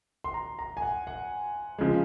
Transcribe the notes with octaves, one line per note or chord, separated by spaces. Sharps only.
C6
A#5
A#5
G#5
F#5
F#5
C#3 F3 G#3